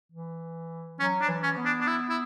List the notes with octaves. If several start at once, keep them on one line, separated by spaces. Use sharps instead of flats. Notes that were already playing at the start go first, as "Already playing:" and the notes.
E3
F#3 C#4
D4
E3
C#4
B3
D4
D4
E4
E4